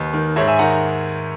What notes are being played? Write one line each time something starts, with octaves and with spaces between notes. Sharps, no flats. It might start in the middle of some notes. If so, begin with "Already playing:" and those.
Already playing: D#2 B4 D#5
D#3
G#2 C#5 E5
E5 G#5
D#3 F#5 A#5